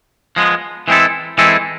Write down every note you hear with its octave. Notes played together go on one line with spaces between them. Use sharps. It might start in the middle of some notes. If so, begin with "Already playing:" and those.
F3 G#3 B3
E3 G#3 C4 E4 A4
E3 G#3 C4 E4 A4